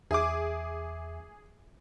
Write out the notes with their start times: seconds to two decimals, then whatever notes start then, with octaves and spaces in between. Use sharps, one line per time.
0.11 E2 G#4 E5 D6